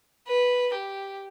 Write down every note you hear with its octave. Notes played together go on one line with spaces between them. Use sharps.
B4
G4